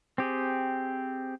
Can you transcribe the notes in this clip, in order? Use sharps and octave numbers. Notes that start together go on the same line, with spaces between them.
C4 G4 G#4